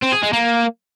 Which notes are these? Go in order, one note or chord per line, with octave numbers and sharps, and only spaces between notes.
C4
G#4
G#3
A#3